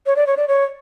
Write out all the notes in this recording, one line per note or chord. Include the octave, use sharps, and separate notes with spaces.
C#5
D5
C#5
D5
C#5